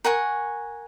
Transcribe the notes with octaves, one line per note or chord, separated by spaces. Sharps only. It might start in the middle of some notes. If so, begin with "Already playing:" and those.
A#4 F#5 G#5 C#6